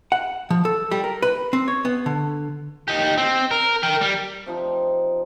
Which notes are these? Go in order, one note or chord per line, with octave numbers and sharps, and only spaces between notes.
F#5
F3
A4
G3
A#4
B4
C4
C#5
B3
D3
D#4 G4
C4
A#4
A#4 G5
G3
C3 F3 D#4